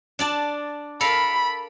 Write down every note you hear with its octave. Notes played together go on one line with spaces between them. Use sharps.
D4 D5 A5
A4 A#4 F5 B5